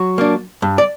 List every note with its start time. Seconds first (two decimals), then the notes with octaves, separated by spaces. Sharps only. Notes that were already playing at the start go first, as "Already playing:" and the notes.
Already playing: F#3 F#4
0.18 A#3 D4
0.62 G2
0.78 D5